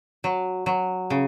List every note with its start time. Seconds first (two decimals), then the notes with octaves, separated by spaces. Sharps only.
0.24 F#3
0.66 F#3
1.10 C#3